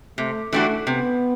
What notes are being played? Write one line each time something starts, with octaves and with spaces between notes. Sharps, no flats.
C3 A3
E3 G3 A3 D4 F#4
C3 B3